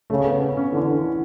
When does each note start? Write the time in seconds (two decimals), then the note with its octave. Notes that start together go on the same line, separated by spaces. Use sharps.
0.10 C#3 A3
0.25 B3
0.41 C#4
0.57 C#4
0.73 D3 E3
0.87 E3
1.03 E3